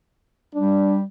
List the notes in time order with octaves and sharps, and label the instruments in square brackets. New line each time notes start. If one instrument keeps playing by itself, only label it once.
[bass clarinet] G3 [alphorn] D4